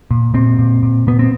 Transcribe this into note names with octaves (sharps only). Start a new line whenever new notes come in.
A#2
A#2 C4
A#2
A#2
A#2 B3
C4